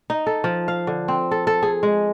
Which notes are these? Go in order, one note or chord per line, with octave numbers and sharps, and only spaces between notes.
D#4
A4
F3
F5
D3
C4
A4
A4
G#4
G#3